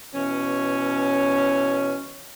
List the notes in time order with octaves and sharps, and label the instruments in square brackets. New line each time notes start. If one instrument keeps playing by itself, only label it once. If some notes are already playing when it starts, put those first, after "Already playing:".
[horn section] B2 E3 C#4